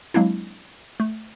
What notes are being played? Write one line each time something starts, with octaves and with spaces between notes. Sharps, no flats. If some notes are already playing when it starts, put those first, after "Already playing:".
F#3 G#3 A#3 C4 D4 E4
A3